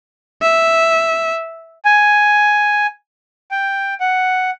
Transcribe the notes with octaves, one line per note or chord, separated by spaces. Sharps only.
E5
G#5
G5
F#5